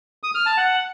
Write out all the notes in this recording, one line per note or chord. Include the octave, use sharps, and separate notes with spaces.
D#6
F6
A5
F#5